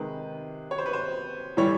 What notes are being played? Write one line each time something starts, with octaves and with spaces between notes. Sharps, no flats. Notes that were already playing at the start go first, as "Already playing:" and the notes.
Already playing: C3 D#3 G#3 B4
C#5
C5
B4
C5
A2 E3 G3 C#5